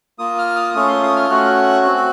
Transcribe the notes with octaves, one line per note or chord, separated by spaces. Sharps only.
A#3 F4 D#6
F6
D#6
A3 C#4 F4 D#6
C6
D#6
F6
A3 C#4 F#4 F#6
C4 F#4